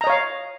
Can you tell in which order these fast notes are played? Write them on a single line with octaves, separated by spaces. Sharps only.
A#5 D#5 C#5 F5